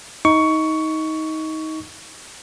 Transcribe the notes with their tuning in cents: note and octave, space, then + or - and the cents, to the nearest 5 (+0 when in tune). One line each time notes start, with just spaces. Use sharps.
D#4 +20 C#6 +15